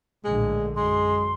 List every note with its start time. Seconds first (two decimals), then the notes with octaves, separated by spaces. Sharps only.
0.25 A#1 A2 D3 G#3
0.76 F#2 G#3 C6